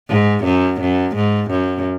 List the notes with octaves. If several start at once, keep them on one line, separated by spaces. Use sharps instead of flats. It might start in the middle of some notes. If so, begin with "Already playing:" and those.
G#2
F#2
F#2
G#2
F#2